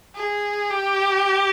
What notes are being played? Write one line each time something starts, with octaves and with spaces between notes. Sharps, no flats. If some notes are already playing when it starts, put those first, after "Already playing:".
G#4
G4